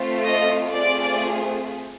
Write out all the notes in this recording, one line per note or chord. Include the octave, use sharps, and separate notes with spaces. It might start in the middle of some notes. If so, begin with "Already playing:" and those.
Already playing: A3 C4 F4
D#5
A3 C4 F4 G#4 D5